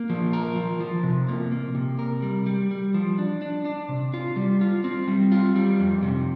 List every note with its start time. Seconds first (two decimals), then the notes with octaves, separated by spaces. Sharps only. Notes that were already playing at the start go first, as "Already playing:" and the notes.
Already playing: A#3
0.10 F3
0.33 A#4
0.56 F3
0.80 F3
1.03 C3
1.28 A#3
1.52 A#3
1.75 C3
1.99 A#4
2.22 G3
2.46 G3
2.71 G3
2.94 F3
3.19 D4
3.42 D4
3.65 D4
3.89 C3
4.14 F4
4.36 G3
4.61 F4
4.84 C4
5.08 G3
5.32 F4
5.56 G3
5.80 F2
6.03 C3